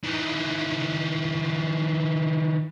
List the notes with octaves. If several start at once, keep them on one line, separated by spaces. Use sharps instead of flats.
D#3 E3